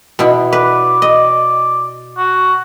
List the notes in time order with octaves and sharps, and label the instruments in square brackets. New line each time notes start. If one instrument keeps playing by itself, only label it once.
[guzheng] B2 E4
[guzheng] B4 [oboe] D5
[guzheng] D#5
[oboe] F#4